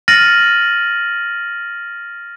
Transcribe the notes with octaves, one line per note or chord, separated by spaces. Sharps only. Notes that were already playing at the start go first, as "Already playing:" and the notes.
F6 A6 A#6 C#7 D#7 F#7